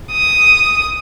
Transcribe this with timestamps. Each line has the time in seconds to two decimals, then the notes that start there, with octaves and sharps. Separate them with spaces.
0.12 D#6